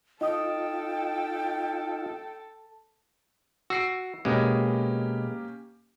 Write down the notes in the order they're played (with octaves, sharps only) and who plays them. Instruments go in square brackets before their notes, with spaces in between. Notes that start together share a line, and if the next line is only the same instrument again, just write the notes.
[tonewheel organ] D#4 F4 [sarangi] A4 [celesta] D#5 D#6 [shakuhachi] G5
[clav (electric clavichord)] F#4 [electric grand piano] E6 C7 D7
[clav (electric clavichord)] B2 G#3 [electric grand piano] A#3 C#4 G4